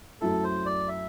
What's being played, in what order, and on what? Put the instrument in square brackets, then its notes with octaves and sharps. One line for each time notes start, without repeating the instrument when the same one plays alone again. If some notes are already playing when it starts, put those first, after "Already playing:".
[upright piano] F#2 F#3 A3 E4 [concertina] A4
[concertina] C5
D5
E5